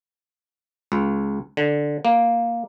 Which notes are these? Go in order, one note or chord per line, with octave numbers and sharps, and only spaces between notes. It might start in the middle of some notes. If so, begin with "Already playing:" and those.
C#2
D3
A#3